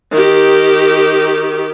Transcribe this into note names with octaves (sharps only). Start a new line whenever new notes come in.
D#3 G4